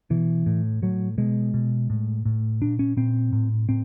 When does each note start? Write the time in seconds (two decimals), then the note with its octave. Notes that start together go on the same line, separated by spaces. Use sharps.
0.10 B2 E3
0.46 A2
0.82 A2 F#3
1.18 B2 G#3
1.54 B2
1.90 A2
2.25 A2
2.61 A#2 D4
2.79 C#4
2.97 A#2 C4
3.32 A2
3.69 A2 C4